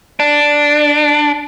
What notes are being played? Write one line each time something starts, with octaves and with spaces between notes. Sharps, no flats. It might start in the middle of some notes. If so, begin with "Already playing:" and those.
D4